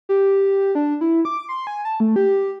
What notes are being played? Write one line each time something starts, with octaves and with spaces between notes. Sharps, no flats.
G4
D4
E4
D6
C6
G#5
A5
A3
G4